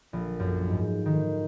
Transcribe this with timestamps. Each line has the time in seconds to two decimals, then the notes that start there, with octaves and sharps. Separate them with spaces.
0.13 A#1
0.40 F#2
0.69 G#2
1.06 D#3